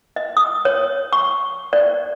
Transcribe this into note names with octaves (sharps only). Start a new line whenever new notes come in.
D#5
D#6
C#5
C#6
D5